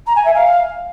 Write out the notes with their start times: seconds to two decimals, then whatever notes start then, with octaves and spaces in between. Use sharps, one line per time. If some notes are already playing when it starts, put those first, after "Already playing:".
0.06 A#5
0.15 G#5
0.25 E5
0.34 F5